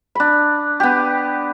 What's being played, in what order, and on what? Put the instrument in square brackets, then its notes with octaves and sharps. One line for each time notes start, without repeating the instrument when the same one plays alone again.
[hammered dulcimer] D4 B5
B3 G4